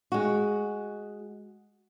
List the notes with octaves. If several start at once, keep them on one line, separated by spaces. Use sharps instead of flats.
G#3 F#4